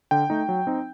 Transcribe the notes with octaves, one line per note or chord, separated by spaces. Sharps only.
D3 G5
A3 D#4
F#3
C4 D#4